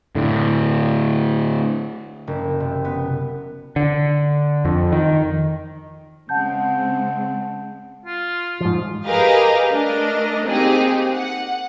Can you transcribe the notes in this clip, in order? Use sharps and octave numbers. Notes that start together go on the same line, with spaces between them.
A2 D3
F#1
C3
B3
D3
F2
D#3
C#3 G#3 C4 F#5 A5 G6
F4
G#2 F3
G4 G#4 A#4 B4 D#5 F5
A3 D4 A#4 D#5
A#3 C4 D#4 G4 G#4
F#5